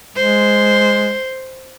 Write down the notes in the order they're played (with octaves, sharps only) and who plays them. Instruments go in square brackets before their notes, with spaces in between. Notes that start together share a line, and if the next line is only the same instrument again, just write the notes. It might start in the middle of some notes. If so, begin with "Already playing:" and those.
[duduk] G#3 [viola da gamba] C5